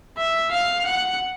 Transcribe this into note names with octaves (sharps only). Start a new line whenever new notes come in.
E5
F5
F#5